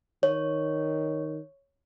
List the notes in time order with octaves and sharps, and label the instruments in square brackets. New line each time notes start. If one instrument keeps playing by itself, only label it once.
[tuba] D#3 [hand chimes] C#5